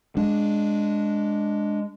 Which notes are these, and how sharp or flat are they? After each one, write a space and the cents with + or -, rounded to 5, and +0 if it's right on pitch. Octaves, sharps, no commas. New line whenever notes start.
G#3 +0 D4 +0